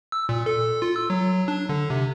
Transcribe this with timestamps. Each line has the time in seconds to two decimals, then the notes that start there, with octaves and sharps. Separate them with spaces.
0.12 E6
0.29 A#2
0.46 A4
0.82 F4
0.96 E6
1.10 F#3
1.48 D4
1.69 D3
1.90 C3